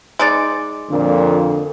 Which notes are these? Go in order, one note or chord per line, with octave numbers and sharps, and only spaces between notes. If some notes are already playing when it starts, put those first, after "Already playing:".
G#3 D#4 D5
F2 A#2 D3